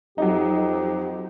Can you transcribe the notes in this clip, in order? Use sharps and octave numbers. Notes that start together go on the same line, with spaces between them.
F2 F#3 D#4 G4